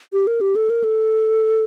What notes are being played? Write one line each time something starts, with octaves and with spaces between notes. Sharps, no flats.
G4
A#4
G4
A4
A#4
A4